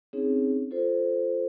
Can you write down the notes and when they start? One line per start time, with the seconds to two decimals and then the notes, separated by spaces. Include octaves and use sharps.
0.13 C4 C#4 D#4 G#4 C#5
0.71 F4 A4 C5